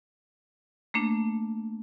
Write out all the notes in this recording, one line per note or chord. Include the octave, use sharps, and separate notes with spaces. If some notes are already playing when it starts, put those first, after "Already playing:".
A3 A#3 D4